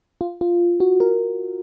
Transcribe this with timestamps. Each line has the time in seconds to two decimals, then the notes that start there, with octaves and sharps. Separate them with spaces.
0.21 F4
0.41 F4
0.80 F#4
1.00 A#4